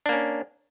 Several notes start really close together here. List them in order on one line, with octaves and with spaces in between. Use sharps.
D4 A#3 C#4